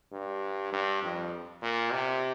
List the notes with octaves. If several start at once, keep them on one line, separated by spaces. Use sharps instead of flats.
G2
G2
F2
A#2
C3